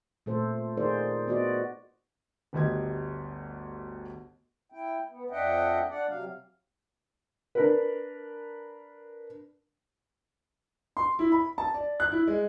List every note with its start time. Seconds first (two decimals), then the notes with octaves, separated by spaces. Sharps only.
0.26 A#2 A3 A4 C5
0.77 D#4 F4 G#4 A#4 C5 D5
1.28 B3 F#4 D5 D#5
2.53 G1 D2 G4 D#5 G#6
4.72 E4 G5
5.09 B3
5.31 F2 D4 D#5 E5 F#5 G5
5.89 D4 D5 F#5
6.09 C3 F#3 F5
7.55 D4 A#4 B4
10.97 C6
11.19 E4
11.32 B5
11.58 A5
11.74 D5
12.00 F#6
12.12 E4
12.28 G#3